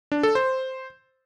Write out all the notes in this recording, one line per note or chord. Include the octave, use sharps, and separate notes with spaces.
D4
A4
C5